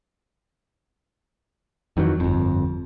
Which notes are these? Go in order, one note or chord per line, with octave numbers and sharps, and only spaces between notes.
F2 D#3 E3 F#3
G1 F2